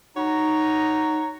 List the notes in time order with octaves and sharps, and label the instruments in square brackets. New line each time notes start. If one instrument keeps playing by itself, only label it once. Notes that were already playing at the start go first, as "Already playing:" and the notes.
[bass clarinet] D#4 [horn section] F#4 C#5 A#5